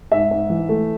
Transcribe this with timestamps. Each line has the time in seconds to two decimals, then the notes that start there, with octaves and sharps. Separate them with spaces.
0.12 G#2 E5
0.31 G#2
0.50 E3
0.69 A3